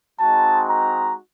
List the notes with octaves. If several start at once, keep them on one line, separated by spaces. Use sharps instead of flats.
G#3 C4 D#4 F#4 A5
A#5